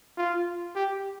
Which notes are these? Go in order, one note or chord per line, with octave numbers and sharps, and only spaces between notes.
F4
G4